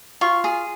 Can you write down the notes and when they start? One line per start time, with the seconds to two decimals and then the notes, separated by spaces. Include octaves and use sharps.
0.21 F4 C#6
0.44 G#4